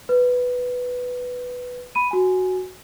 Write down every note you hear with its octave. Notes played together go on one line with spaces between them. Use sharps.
B4
B5 D#7
F#4 G#5